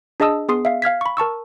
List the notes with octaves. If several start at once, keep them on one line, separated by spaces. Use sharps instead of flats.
D4 G#4 D#5 A5 D#6 E6
B3 G#4 C6 D#6 C7
E5 F5
F5 F6 G#6 B6
B5 C#6
A#4 A5 C#6 E6